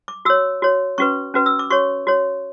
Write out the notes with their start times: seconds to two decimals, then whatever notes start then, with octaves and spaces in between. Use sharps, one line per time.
0.08 D6
0.25 F#4 C#5 E6
0.62 F#4 C#5
0.98 C#4 F#4 B4 C#6
1.34 C#4 F#4 B4
1.46 E6
1.59 D6
1.70 F#4 C#5 C#6
2.07 F#4 C#5